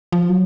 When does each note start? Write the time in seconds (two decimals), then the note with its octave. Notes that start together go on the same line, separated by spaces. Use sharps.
0.12 F3
0.29 F#3